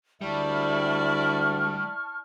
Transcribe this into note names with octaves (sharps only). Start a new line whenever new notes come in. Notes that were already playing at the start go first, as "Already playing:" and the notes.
D2 G3 E4 D5 A5 C#6 F6